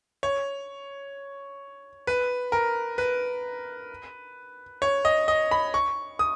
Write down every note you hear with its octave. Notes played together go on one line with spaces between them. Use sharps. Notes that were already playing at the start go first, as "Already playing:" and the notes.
C#5
B4
A#4
B4
C#5
D#5
D#5
B5
C#6
D#6